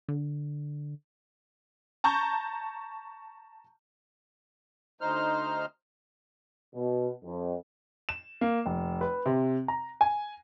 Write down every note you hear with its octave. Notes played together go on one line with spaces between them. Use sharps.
D3
A5 A#5 C#6 G6
D2 D#4 C5 F6
B2
F2
E7
A#3
F1
B4
C3
A#5
G#5